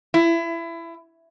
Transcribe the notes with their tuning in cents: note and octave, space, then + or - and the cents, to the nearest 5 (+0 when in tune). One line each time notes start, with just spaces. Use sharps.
E4 +25